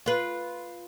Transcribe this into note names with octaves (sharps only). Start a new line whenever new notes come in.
F4 B4